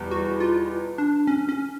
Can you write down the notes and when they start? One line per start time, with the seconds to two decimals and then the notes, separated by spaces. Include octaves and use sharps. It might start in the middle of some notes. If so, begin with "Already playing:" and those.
Already playing: E2 B2 G3
0.11 F#4
0.40 F4
0.98 D4
1.27 C#4
1.49 C#4